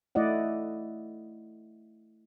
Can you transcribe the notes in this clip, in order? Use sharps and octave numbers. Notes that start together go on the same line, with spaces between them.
A3 E4 D5 D#5 F#5